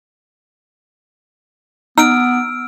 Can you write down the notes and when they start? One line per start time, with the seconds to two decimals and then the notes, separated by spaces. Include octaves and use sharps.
1.98 B3 D#4 E6 F6 D7